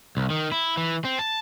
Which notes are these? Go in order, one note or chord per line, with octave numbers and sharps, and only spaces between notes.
C2
D#3
E4
E3
C4
A5